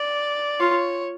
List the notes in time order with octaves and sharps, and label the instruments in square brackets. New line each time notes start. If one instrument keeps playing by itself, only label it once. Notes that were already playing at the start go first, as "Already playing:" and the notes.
Already playing: [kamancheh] D5
[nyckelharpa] F4 [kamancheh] C#5